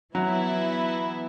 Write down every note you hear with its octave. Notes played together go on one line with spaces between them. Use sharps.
E3 F#3 B3 E4